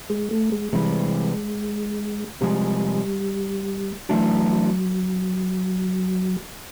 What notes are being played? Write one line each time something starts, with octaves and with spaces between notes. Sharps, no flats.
G#3
A3
G#3
C3 E3 G3 G#3
C3 F3 G3 G#3
E3 F#3 A3 D4